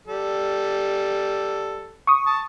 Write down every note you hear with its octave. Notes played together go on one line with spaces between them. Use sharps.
G3 A4
C#6 D#6
A5